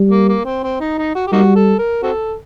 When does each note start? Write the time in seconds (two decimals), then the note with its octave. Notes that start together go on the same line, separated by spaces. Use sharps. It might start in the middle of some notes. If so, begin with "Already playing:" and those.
Already playing: G3
0.11 A#3
0.29 A#3
0.45 C4
0.63 C4
0.80 D#4
0.98 D#4
1.15 F#4
1.27 G4
1.32 G3 A#3 D#4 F#4
1.56 A4
1.79 A#4
2.03 C4 F#4 A4